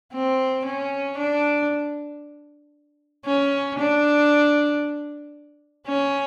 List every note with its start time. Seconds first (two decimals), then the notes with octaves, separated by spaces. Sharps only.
0.14 C4
0.66 C#4
1.18 D4
3.26 C#4
3.79 D4
5.87 C#4